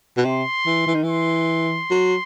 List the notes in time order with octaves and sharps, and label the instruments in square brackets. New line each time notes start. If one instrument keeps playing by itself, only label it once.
[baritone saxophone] B2
[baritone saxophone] C3 [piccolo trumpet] C6
[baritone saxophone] E3
E3
D#3
[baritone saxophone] E3 [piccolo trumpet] C6
[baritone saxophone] F#3